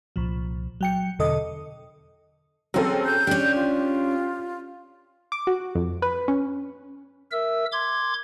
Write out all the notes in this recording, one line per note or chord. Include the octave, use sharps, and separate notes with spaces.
C2 A#2 F3
F#3 G5 C#7
E2 B2 D3 A4 D#5 D#6
F#3 C4 C#4 G#4 A4
G6
C#4 D4 G4
F4
D6
F#4
F2
B4
C#4
A#4 E5 E6
C6 D6 G#6